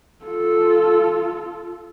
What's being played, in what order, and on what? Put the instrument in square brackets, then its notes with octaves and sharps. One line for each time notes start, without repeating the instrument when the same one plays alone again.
[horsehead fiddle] F4 A4